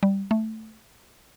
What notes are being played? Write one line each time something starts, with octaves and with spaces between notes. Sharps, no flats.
G3
A3